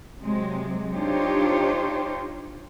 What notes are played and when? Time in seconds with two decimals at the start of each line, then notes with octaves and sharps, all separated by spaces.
0.20 C3 F#3 G#3 C4
0.95 D4 D#4 F4 G4 C5 C#5